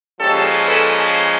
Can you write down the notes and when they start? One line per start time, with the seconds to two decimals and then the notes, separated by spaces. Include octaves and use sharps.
0.19 A#2 F3 G#3 C#4 G4 A4
0.66 A4 B4